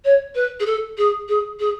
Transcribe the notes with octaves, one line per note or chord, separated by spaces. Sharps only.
C#5
B4
G#4
A4
G#4
G#4
G#4